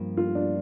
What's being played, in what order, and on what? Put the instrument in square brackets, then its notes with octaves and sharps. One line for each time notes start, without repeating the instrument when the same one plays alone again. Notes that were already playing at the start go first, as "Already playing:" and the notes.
Already playing: [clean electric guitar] G2 F3 A#3
[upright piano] F4
D4